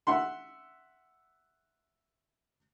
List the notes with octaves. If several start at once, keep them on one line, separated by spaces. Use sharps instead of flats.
E5 F#5 C6